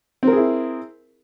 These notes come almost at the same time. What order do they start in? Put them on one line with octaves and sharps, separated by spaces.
C4 A#4 G#4 E4